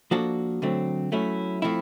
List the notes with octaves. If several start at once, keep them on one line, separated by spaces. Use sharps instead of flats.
F3 A#3 D4 F#4 A4
D3 F#3 A3 C4
F#3 A3 C#4 E4
F3 A3 C4 E4